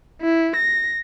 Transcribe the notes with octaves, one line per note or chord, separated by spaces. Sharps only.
E4
A#6